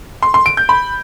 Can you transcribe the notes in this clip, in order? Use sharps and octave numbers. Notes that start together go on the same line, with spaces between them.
C6
C6
D7
G6
B5